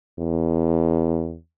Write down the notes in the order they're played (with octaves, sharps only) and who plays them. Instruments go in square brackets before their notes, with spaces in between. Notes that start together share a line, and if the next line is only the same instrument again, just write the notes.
[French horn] E2